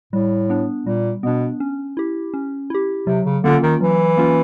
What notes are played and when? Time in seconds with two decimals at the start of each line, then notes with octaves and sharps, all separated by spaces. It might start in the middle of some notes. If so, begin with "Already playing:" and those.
0.13 A2 G3
0.50 B3 D4
0.87 A#2 G3
1.23 B2 B3 D4
1.60 C#4
1.97 E4 G4
2.34 C#4
2.70 E4 G4
3.07 C3 F#3
3.25 C#3
3.44 D3 A#3 C#4 F4
3.63 D#3
3.81 E3 F#3
4.17 A#3 C#4 F4